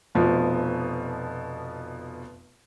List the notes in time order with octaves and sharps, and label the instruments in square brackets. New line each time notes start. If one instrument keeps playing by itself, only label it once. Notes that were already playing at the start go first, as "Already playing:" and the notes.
[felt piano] F1 B2 F3